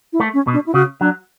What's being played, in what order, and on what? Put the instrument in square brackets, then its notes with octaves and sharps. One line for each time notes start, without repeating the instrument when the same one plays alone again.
[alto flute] E4
[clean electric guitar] A3
[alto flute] C#4
[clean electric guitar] B2
[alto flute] D4
E4
[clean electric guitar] C#3 [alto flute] F#4
[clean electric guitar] F#3 [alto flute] D4